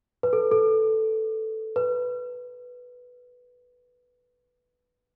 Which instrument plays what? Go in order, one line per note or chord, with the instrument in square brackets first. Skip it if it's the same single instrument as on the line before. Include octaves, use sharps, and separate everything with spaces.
[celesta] B4
A4
A4
B4